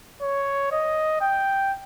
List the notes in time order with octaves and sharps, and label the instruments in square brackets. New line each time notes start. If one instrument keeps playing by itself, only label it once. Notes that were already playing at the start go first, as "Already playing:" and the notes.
[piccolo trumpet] C#5
D#5
G5